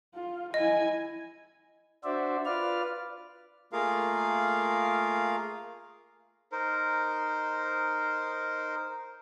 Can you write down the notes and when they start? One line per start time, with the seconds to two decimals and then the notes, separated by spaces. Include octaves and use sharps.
0.15 F4
0.54 E4 D#5 G#5
2.04 D4 F#4 C5 D5 E5
2.45 F4 B4 D5 F6
3.73 A3 A#3 F4 G#4 A#4 F5
6.52 D#4 A#4 C5